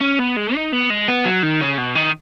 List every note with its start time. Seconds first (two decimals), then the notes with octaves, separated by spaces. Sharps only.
0.01 C#4
0.19 B3
0.37 G#3
0.55 D#4
0.72 B3
0.90 G#3
1.08 B3
1.25 F#3
1.43 D#3
1.61 C#3
1.78 B2
1.96 D#3